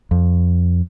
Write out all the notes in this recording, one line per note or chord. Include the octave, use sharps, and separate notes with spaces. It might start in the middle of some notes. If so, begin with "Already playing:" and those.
F2